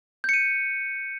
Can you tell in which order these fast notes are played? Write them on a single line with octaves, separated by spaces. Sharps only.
G6 C#7 D#7